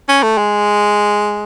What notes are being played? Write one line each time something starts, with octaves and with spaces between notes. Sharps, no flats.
C#4
A3
G#3